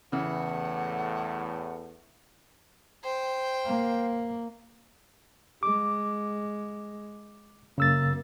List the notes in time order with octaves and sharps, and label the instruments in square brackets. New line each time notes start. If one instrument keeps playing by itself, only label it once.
[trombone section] E2 A2 [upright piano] C#3 E3 [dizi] F#5
[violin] C5 G5
[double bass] A#3
[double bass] G#3 [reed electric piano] D6
[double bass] F#2 A#3 [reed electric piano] C#3 E6 A6